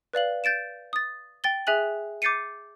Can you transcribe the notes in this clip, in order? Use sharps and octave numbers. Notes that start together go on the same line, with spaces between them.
B4 D5 F5 F#7
G6 A6 D7 E7
D#6 A6
G5 A6 G7
G#4 E5 G#5 F#6 F#7
D6 G6 A6 C7 C#7 D#7